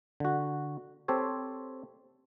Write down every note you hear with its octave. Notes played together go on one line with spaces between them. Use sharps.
D3 F#4
C4 G4 A4 C5 C#5